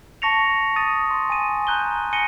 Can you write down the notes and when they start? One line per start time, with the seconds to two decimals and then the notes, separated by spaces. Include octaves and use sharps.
0.22 A5 C#6 A#6 C#7 F7
0.76 D#6 A6 D#7
1.11 C6
1.30 G#5 D#7
1.67 A#5 F#6 G6 D#7 G7
2.13 G#5 A#6 C#7 D#7 G7